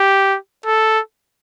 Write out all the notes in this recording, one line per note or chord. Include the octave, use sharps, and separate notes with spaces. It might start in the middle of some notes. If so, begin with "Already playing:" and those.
Already playing: G4
A4